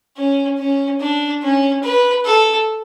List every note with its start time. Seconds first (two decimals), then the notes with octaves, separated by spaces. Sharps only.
0.17 C#4
0.59 C#4
1.00 D4
1.43 C#4
1.83 B4
2.25 A4